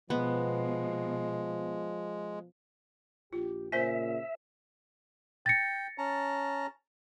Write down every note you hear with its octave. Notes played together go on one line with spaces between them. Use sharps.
B2 F3 G#3 B3
A#1 F4 G4
A#2 C#3 C5 E5 G#5
G5 A6 A#6 C#7
C#4 A5 A#5